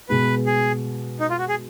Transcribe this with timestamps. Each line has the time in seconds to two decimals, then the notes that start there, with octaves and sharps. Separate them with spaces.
0.09 B2 G#3 B3 B4
0.46 G#4
1.20 D#4
1.30 F4
1.39 F#4
1.49 G#4